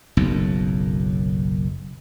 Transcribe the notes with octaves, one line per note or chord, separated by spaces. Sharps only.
F#1 B1 F#2